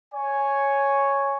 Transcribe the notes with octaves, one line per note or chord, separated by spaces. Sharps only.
C#5 G#5